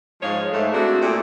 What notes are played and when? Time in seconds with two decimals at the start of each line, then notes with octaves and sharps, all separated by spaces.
0.22 G#2 F3 G#3 G#4 C#5 F5
0.52 G#2 A3
0.73 A3 C4 D4 E4 F#4 G#4
1.01 A#2 A3 G4